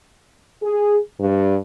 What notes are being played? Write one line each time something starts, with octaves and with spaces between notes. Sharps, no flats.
G#4
G2